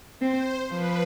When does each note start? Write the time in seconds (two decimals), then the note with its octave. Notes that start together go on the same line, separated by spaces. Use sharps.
0.21 C4 C5
0.72 F3 B4